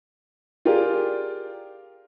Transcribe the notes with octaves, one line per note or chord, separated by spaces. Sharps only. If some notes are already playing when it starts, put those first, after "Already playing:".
F4 G4 G#4 A#4 D5